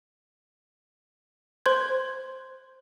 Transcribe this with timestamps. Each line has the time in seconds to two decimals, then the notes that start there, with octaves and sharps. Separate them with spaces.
1.66 C5 C6 G6 G#6